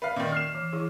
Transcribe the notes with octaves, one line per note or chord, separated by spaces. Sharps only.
B4 D5 E5 F5
A#2 D#3
F6 C7 E7
E3
E3 E4 G#4